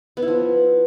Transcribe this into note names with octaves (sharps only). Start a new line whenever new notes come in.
B3
E4
F3